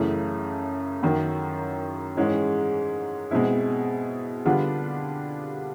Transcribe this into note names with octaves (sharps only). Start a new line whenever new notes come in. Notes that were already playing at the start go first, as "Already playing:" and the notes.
Already playing: F#2 C#3 E3 A3
F#2 D#3 F#3
G#2 E3 G#3 C#4
B2 G#3 C4 E4
D3 G3 B3 D4 F4